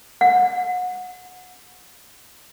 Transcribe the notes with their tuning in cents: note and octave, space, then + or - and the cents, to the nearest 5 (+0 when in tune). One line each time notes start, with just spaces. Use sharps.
F#5 -30